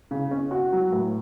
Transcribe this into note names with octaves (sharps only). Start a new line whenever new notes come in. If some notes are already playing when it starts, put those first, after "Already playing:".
C#3
C#4
F#4
F#3
A2